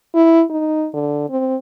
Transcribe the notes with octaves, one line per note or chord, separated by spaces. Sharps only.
E4
D#4
D3
C4